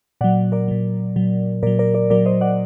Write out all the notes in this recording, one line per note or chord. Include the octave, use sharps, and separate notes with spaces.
A#2 F#3 D5 F#5
A#4 D5
A#2 F#3
A#2 F#3
A#2 F#3 A#4 D5
A#4 D5
A#4 D5
A#2 F#3 A#4 D5
C5 D#5
D5 F#5